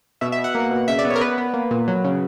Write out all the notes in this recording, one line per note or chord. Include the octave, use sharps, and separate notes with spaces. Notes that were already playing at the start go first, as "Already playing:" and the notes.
B2 E5
E5
B2
F#5
A#3
B2
C#3 E5
D5
B3
C#5
A#4
B3 B4
B3
A#3
A#2
F#3
C#3